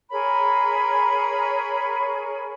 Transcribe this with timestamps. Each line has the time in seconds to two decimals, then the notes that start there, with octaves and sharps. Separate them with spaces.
0.11 G#4 A#4 C#5 B5